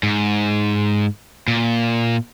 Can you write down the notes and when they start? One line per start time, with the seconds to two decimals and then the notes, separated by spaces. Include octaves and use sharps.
0.03 G#2
1.48 A#2